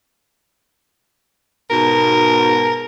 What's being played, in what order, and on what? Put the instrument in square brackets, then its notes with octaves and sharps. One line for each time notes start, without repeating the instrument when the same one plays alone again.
[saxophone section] G#2 B2 [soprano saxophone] A#4